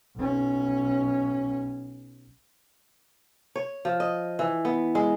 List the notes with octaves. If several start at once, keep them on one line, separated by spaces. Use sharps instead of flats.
B1 C#4
C#5
F3
D#5
E3
B3
G#3